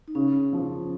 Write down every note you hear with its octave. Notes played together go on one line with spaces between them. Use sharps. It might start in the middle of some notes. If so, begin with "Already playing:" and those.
D#4
C#3 C#4
F3